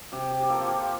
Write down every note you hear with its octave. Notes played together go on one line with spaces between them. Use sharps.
C3 G4
G4
G4
F3 A#3 A4
F4
G4